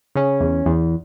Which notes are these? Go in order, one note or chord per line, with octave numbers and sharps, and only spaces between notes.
C#3 C#4
E2
E2